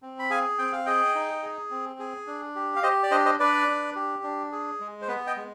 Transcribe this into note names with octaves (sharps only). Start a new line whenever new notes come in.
C4
B5
G#4 F5 G#5
C4 G5
F5
G#4 D#5 G5
D#4
G#4
C4
G#4
D4
G4
F5
G4 C5 D#5
D5
D4 C5 D#5
C5 D#5
D4 B4 D5
D4
G4
D4
G#4
G#3
C5
B3 B4
D#5 G5
G#3